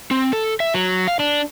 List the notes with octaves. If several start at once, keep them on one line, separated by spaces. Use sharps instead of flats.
C4
A4
E5
F#3
F5
D4